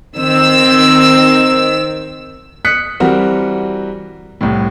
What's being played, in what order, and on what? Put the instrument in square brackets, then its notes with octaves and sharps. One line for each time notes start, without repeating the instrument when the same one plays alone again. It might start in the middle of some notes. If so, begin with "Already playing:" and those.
[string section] D#3 C4 E6
[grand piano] D#6 F#6 B6 C#7
E3 G3 C4 F#4 A#4
C2 A2